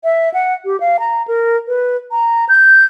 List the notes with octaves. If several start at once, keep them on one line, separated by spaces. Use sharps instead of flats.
E5
F#5
G4
F5
A#5
A#4
B4
A#5
G6